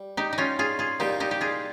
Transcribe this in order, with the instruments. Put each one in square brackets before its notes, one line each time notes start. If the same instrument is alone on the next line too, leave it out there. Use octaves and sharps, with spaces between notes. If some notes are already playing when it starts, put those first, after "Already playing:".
Already playing: [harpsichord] G3
[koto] D#4 G4
D#4
C#4 F4
F4 G#4
F4 G#4
[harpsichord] C2 A#2 G3 A#3 [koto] D#4 G4
[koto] D#4 G4
G4
F4 G#4